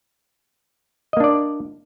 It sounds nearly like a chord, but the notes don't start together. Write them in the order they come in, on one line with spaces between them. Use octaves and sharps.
D#5 A#3 D4 D5